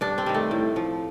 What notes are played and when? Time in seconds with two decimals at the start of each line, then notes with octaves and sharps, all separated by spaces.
0.01 G2 D4
0.18 C4
0.26 D#3 G3
0.34 A3
0.51 A2
0.76 F3